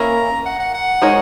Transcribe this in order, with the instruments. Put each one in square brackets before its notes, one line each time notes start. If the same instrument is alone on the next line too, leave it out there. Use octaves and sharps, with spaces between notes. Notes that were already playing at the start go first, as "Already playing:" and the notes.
Already playing: [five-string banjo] E3 A#3 C#4 E4 A#4 [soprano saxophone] A#5
[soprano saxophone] F#5
F#5
F#5
[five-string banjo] G#3 D#4 A#4 C#5